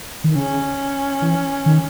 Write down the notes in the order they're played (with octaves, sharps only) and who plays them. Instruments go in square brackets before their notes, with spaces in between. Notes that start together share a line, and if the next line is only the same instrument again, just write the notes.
[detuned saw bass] D#3
[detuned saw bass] C#3 [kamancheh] C#4
[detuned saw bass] E3
D#3